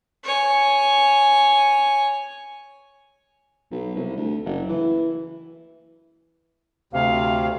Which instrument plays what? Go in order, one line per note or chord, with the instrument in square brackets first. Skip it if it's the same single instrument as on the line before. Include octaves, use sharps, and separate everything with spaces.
[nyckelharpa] C#5 G#5
[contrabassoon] B1
C2
D2
F#1
E3
[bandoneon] D2 C3 [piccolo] F5